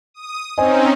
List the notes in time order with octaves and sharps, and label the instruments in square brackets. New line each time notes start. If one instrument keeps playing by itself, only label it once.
[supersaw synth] D#6
[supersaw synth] C4 C#4 D#4 [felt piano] C5 D#5 G#5